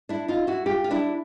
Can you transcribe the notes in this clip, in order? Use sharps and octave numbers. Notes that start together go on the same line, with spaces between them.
D4 E4
D#4 F4
E4 F#4
F4 G4
F4
D4 E4